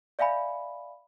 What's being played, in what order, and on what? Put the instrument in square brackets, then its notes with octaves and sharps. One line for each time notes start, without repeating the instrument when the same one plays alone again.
[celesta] D5 E5 F5 G#5 B5